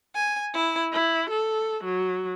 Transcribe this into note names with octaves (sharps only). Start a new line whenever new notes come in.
G#5
E4
E4
A4
F#3